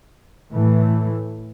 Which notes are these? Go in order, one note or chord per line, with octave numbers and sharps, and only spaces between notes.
A2 E3 A3